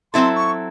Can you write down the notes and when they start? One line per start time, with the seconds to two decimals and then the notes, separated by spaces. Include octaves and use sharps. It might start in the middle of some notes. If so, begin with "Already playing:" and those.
0.13 F#3 C4 E4 A4 C6
0.36 C#6